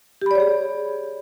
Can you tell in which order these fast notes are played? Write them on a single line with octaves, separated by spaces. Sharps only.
G4 B5 D5 C#5 G#4